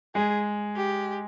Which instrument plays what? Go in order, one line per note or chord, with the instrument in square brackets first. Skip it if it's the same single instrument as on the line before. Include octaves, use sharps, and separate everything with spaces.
[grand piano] G#3 [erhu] G#4
[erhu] G4